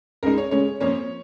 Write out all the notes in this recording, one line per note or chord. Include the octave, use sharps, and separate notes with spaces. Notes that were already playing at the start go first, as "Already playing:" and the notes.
C#2 C#3 G#3 D#4 A#4
C#5
C#3 G#3 C#4 C#5
F2 F3 A#3 C#4 C#5